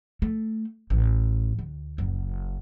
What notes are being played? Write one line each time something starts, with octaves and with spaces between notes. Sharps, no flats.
A3
A1
D2
F#1